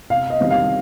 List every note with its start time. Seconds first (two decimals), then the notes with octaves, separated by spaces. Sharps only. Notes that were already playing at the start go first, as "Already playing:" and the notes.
0.10 C3 F5
0.30 D#5
0.40 D#3 G3 C4
0.50 F5